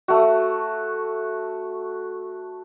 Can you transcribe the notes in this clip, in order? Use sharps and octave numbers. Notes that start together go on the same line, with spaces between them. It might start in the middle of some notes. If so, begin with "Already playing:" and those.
A3 F#4